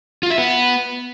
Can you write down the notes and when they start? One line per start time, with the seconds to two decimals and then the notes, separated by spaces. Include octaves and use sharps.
0.23 F4
0.30 E5
0.38 B3